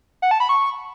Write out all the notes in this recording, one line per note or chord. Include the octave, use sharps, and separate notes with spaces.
F#5
A5
B5
C#6